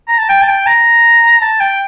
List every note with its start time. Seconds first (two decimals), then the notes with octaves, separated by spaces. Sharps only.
0.08 A#5
0.18 A5
0.29 G5
0.42 A5
0.48 G5
0.66 A#5
1.41 A5
1.60 G5